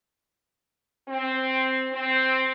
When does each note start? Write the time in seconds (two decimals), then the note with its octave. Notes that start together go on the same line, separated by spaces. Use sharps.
1.08 C4
1.93 C4